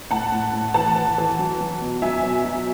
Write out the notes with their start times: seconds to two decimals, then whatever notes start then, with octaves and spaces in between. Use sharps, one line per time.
0.11 A2 F#5 A5
0.32 A2
0.53 A2
0.74 E3 F#5 A5
0.96 E3
1.18 E3
1.39 F#3
1.61 F#3
1.81 B2
2.02 F#3 E5 G#5
2.23 B2
2.45 F#3